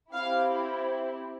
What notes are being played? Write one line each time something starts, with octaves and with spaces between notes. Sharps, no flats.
C4 E4 G4 F5